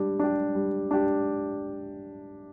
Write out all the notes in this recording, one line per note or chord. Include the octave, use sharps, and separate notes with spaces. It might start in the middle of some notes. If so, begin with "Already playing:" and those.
Already playing: G3 D4 G4
D4 G4
G3
D4 G4